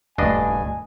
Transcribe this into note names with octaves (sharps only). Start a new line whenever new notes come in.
D#1 C#2 G2 A3 D4 D#5 G#5